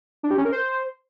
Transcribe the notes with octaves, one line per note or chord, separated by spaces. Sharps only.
D4
G4
C#4
A#4
C5